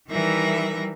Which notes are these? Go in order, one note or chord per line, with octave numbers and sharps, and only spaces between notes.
D#3 E3 G3 A#4 E5 A#6